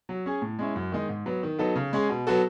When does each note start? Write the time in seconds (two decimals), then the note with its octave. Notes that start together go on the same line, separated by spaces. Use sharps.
0.09 F#3
0.26 C#4 G#4
0.42 A2
0.59 G#3 C#4 E4
0.76 F#2
0.92 D#3 G#3 D#4
1.09 G#2
1.26 F#3 B3
1.43 D#3
1.59 F#3 B3 D#4 A4
1.75 C#3
1.93 G#3 C#4 G#4
2.09 B2
2.27 F#3 B3 F#4 A4